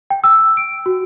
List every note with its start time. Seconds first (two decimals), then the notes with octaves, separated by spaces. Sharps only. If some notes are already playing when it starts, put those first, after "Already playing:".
0.10 G5
0.24 E6
0.57 D7
0.86 F#4